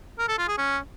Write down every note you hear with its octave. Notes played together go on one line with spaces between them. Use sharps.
A#4
A4
F4
G#4
C#4